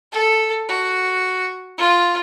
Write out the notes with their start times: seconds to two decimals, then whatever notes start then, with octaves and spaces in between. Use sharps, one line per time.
0.12 A4
0.68 F#4
1.78 F4